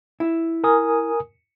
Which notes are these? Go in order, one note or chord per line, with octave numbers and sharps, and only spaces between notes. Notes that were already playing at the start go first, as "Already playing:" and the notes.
E4
A#4 G#5 D#6